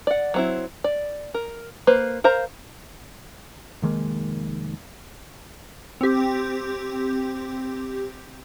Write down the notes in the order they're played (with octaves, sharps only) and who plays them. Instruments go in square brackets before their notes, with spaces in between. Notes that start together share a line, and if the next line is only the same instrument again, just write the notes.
[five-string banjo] D5 F#5
F#3 C4 E4
D5
A#4
A#3 B4 C5
A#4 C5 F5 A#5
[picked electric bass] F1 D#3 G#3 A#3
[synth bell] C4 G4